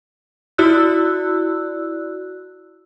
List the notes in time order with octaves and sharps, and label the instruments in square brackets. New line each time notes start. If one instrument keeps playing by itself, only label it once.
[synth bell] E4 F#4 D5 E6 F#6